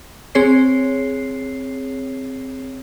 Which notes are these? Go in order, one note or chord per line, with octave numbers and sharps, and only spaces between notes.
C4 G#4 C#5 C7